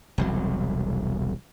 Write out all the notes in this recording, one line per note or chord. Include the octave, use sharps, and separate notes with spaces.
E1 C2 F#3